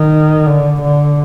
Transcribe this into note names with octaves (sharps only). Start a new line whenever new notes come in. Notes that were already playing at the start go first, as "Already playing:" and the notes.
Already playing: D#3
D3
D3